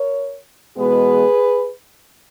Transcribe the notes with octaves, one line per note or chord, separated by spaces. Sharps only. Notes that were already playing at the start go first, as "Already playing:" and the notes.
Already playing: A#4 C#5
E2 B2 G#3 B3 G#4 B4